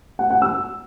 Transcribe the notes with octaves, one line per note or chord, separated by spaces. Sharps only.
F#5
F#5
E6